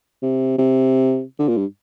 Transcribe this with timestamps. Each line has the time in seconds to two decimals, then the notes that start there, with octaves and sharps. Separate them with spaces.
0.23 C3
0.58 C3
1.39 D3
1.48 A#2
1.57 G2